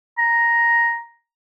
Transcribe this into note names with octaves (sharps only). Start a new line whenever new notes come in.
A#5